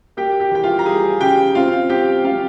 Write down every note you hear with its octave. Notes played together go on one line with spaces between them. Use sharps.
A#3 G4 G5
G4 G5
E2 G5
F4 F5
A#5
G3 G#4 G#5
C#3 G4 G5
C4 F4 F5
C4 G4 G5
C4 F4 F5